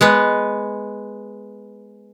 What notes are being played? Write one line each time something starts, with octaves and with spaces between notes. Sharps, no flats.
G#3 B3 B4